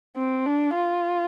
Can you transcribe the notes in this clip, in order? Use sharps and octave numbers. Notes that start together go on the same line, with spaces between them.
C4
D4
F4